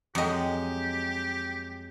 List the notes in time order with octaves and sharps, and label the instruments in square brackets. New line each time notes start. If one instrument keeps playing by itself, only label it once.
[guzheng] F2 D#5 [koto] F#3 G#3 [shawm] G4